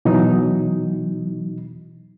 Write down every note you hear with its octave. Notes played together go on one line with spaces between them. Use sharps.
B2 E3 F#3 D#4